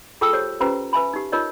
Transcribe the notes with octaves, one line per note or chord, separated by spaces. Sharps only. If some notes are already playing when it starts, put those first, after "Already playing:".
F4 G#4 A4 G5 A5 E6
G4 C5 C#5
C#4 F4 G4 B4 C5 A#5
B4 E5 G#5 B5
D#4 G4
D#4 F4 A#4 C#5 D#5